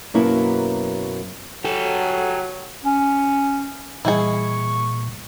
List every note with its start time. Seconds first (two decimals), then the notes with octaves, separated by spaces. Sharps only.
0.14 F#2 B2 F#3 A#3 B3 E4
1.64 F#3 G4 A4
2.84 C#4
4.05 A#2 E3 G3 E4 G#4 D#5 C#6